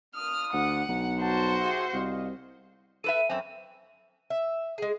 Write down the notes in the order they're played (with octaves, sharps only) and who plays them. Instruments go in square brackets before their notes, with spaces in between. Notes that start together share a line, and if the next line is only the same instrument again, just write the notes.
[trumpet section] D4 F4 D#6 [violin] F6
[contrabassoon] D2 [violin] F#5
[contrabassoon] B1
[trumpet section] G3 A5 [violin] F#4 C5
[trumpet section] G4 G#4 E5
[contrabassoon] C2 [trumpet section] D#5 F5
[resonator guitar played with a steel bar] A4 B4 E5 [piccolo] D#7
[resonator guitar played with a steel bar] F#2 C4
[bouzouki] E5
G#3 G#4